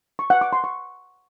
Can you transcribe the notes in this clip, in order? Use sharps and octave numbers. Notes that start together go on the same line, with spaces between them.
C#6
F#5
D6
C6
C#6